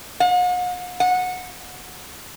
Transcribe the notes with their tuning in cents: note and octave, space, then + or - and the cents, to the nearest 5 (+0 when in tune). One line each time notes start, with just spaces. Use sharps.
F#5 -45
F#5 -15